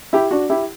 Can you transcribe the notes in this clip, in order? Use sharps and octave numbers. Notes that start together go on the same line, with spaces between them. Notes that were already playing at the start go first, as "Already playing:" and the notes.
E4 G4
D4 F#4
E4 G4